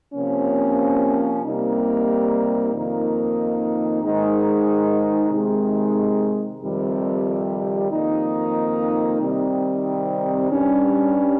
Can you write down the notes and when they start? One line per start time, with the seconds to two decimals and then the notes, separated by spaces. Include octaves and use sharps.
0.13 C3 F3 A#3 C#4
1.42 C3 G3 A#3 D#4
2.72 F2 D#3 A#3 D#4
4.01 G#2 D#3 G#3 D#4
5.31 C3 D#3 G#3 D#4
6.61 F2 C3 D#3 G3
7.90 F2 D#3 A#3 D#4
9.20 C3 D#3 G3 C4 D#4
10.49 G2 G3 C#4